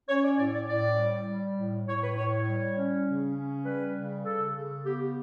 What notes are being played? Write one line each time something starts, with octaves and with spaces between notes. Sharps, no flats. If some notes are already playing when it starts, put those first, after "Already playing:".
C#4 C#5
D5
A2 D5
D5
A2 D5
G3
G3
A2
A2 C#5
B4
A2 C#5
C#5
G3
C#4
C#3
C#4
G3 B4
C#3
C#3 A4
C#3
B3 G4